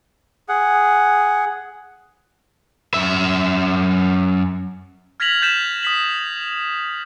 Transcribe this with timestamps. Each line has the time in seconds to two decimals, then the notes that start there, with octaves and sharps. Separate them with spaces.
0.49 G#4 F#5
2.94 F#2 E5
5.20 F6 G#6 A#6 B6 F7 F#7
5.42 G6 A6 B6 E7
5.83 D#6 B6 F#7